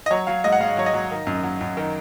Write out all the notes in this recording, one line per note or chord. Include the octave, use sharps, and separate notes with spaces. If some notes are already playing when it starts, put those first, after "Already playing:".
D#5
F#3 C#5
F#3 F5
G#2 D#5
F#5
G#2 F5
F#3 C#5
D#5
F#3
D#3
F#2
F#3
F#2
D#3